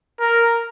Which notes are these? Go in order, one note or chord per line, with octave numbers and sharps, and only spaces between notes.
A#4